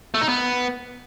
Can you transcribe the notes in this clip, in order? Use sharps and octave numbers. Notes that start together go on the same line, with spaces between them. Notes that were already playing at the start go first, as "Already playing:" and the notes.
A3
D#4
B3